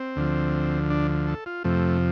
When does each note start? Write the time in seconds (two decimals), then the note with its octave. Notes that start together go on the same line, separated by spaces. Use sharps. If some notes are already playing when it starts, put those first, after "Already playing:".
Already playing: C4
0.16 D2 D3 F3
0.90 D4
1.27 A4
1.46 F4
1.64 F2 C3 F3 A3